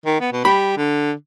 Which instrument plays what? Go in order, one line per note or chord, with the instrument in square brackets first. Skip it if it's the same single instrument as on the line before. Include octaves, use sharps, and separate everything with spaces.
[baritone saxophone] D#3
B3
B2
[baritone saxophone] G3 [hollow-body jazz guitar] B5
[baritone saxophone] D3